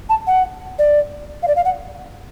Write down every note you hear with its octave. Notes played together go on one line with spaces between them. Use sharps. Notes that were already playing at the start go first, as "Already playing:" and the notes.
A5
F#5
D5
F5
D5
F5
F#5